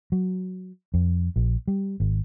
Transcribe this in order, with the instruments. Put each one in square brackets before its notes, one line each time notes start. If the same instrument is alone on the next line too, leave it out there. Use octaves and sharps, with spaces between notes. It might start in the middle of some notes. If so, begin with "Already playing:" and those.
[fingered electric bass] F#3
F2
A#1
G3
G#1